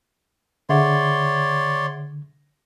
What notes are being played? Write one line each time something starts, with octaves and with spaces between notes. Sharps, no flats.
D3 G#4 C#5 D5 E5 F#5 C6